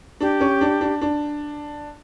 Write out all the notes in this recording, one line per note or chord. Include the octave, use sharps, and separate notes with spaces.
D4 G4
C#4
D4
D4
D4